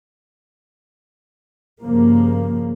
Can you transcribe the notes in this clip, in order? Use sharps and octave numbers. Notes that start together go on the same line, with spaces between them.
G2 C#3 F3 A#3